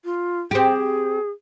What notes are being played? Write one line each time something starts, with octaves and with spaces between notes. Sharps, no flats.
F4
C4 G4 G#4